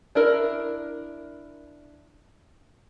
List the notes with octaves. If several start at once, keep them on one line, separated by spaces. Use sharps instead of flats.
D4 E4 A#4